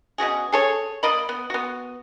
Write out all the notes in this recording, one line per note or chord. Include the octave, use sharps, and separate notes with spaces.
B2 C#4 F#4 G#4
G#4 A4 C#5
A#3 D5 D#5 B5
B3
B3 F#4